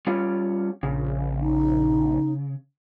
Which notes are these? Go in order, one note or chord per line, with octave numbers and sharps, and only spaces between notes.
G3 C#4 F4
A#1 C#3
D#4